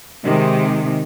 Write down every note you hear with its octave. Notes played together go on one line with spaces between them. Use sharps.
C3 D#3 G#3